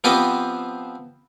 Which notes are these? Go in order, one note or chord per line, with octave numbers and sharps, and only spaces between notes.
F3 B3 C4 G4 B4 D#5